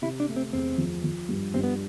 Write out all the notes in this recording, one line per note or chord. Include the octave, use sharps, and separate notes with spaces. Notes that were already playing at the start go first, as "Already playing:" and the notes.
C3 E4
D4
A3
C4
E2 C4
F3
F3
G2
G2 C4
B3